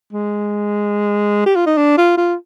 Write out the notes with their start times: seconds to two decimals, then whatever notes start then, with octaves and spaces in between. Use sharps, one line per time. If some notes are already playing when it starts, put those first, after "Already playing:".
0.13 G#3
1.46 G4
1.56 F4
1.66 D#4
1.77 D4
1.98 F4
2.18 F4